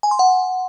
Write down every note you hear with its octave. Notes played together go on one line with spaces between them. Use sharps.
G#5
C6
F#5